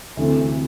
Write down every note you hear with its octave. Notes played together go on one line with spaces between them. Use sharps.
D2 C3 E3 A3 C4